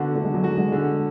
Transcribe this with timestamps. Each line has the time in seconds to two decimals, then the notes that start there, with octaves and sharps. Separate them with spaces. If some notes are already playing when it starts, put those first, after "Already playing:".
Already playing: D3 B3 F#4
0.15 D3 A3
0.24 G#3
0.34 F#3
0.44 G#3 F#4
0.57 G#3
0.72 D3